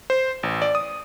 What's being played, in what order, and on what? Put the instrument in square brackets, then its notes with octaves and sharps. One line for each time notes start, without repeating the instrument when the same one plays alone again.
[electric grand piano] C5
A1
D5
D#6